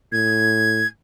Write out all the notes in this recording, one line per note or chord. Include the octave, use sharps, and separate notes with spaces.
A2 G#6